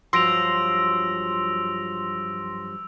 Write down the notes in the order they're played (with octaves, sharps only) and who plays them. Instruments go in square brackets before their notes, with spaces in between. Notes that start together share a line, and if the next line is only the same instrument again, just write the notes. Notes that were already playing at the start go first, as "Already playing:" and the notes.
[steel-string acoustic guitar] G2 F3 F#3 [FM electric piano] C6 A#6 [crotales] E6 D7 F7